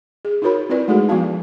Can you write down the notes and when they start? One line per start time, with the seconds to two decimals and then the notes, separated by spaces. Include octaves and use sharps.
0.25 G#4
0.42 D#4 F4 F#4 A#4 C#5 B5
0.69 C4 E4 F4 B4 D5
0.88 G#3 A3 D#4 F#4 G#4 A4
1.09 F3 B3 F#4 F5 A5